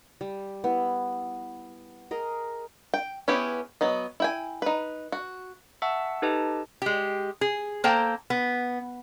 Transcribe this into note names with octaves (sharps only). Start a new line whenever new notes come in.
G3
B3 E4
G#4 A#4 D#5
G5
B3 C#4 E4 G4 G#4
F#3 B3 D#5
E4 G5 G#5
D#4 B4
F#4
E5 F#5 A5 C#6 E6
D#4 G4 A4 B4 D#5 A5
G#3 G4
G#4
A#3 A4 C5 G5 A#5
B3